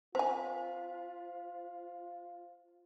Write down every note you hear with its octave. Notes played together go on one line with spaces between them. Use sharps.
C4 F4 C5 G#5